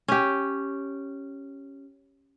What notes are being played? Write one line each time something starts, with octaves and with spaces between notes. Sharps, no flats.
C#4 G4